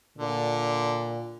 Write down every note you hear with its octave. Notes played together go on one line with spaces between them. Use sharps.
A#2 D3